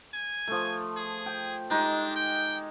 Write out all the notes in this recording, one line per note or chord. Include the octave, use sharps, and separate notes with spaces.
G#5
F3 A3
G#4
G5
G#3 D4 D#4 G4
G5